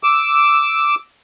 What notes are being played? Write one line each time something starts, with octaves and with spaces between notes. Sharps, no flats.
D6 E6